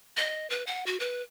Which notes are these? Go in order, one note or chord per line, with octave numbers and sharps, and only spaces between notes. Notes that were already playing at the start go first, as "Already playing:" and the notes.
D#5
B4
F#5
F#4
B4